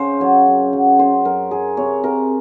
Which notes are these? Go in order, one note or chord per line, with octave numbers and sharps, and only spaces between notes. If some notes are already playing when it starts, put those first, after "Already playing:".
Already playing: C#3 C#4 C5
F#3 C#5
F#2
F#3
F#3 C5
F#2 A#4
F#2 G#4
C3 C#5
C3 A#4